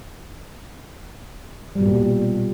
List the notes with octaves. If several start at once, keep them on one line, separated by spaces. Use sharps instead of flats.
G3
B2
A#2